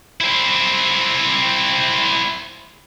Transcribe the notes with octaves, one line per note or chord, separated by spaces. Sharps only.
C4 E4